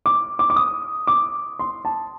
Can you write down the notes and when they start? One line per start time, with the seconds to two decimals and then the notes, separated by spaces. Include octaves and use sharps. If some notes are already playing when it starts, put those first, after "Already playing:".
0.06 D6
0.39 D6
0.50 D6
0.56 D#6
1.07 D6
1.59 C6
1.85 A5